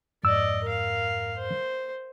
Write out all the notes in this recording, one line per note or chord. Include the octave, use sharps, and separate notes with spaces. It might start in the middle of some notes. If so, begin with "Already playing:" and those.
F2 G#2 D5 D#5 E6
A#4 F5
C5